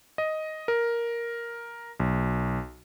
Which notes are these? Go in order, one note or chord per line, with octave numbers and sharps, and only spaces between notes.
D#5
A#4
B1